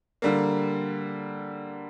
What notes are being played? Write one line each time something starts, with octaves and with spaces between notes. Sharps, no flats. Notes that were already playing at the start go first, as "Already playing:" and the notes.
D3 G3 A#3